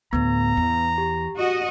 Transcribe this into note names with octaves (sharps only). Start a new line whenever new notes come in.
D2 A2 B3 A#5
E2
G4
F#4 D#5